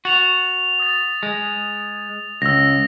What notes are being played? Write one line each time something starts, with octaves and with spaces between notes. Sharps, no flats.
F#4 A6 F7
D#6 A6
G#3
C#2 E6 A#6